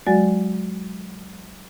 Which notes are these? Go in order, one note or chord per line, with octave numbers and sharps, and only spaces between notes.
F#3 G#3 F#4 D5 G#5 A6